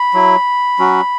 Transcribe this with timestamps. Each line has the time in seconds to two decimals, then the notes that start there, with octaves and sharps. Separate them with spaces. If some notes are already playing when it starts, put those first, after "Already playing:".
Already playing: B5
0.14 F#3 E4
0.79 F#3 C#4 F#4